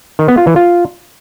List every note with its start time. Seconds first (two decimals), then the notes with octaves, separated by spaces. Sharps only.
0.19 D#3
0.28 B3
0.37 F4
0.47 E3
0.56 F4